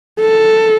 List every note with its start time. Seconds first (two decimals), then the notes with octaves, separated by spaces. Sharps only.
0.21 A4